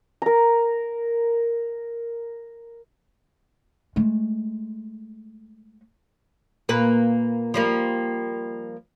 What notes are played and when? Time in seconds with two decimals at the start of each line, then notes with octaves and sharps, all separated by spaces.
0.22 A#4 A#5
3.96 G#3 A3
6.69 A#2 A#3 B4
7.54 F3 G3 A#3